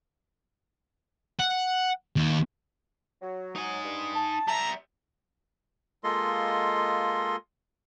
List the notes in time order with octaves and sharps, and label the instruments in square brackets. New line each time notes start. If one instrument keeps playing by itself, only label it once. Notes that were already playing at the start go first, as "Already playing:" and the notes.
[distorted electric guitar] F#5
D#2
[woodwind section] F#3
[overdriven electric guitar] D#4 G#5
[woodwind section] G2
A5
[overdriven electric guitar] G3 E5 [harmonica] A#5
[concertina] G#3 A#3 F4 A4 D#5 C6